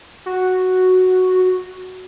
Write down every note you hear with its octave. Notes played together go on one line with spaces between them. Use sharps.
F#4